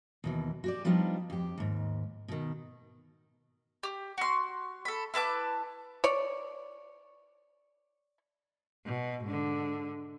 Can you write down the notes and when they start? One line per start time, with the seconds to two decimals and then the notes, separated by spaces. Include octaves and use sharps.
0.24 D#2 B2 E3
0.64 F#4 G4 D5
0.85 F3 G3 B3 D4 D#4 F4
1.30 F2 G4
1.58 D#2 G#2
2.28 B2 D#3
3.83 G4
4.18 F#4 C6
4.85 A4 B5
5.14 E4 B4 A5 D6
6.04 C#5 D5
8.85 B2
9.23 G#2 D3